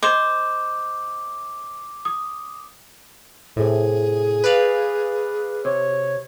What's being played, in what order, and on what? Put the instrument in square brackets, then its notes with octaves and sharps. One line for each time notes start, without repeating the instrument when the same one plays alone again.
[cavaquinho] C5 [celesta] D#5 E7 [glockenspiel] D6
[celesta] D#6
[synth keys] A2 C3 [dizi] G#4
[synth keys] B4 D5 F5
[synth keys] C3 [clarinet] C#5